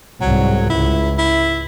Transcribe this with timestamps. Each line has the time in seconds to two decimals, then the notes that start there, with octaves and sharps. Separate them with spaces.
0.22 C2 G#2 F#3
0.70 C#2 E4
1.18 E4